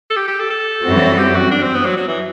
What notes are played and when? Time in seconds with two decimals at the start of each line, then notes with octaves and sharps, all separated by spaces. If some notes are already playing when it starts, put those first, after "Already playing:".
0.10 A4
0.16 G4
0.28 G4
0.39 A4
0.50 A4
0.84 F#2 E3 G3 C4 F#4
1.18 G4
1.35 F#4
1.51 D4
1.63 C4
1.75 B3
1.85 F#3
1.97 F#3
2.08 E3